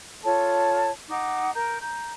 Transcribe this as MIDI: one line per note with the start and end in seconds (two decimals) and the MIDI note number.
0.23 0.89 65
0.23 0.89 69
0.23 0.89 73
0.23 0.89 81
1.09 1.51 63
1.09 1.51 78
1.09 1.51 86
1.54 1.78 70
1.54 1.78 82
1.54 1.78 91
1.80 2.13 82
1.80 2.13 91